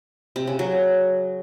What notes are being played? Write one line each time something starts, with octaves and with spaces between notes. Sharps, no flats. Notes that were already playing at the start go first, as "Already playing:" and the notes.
C3
C#3
F#3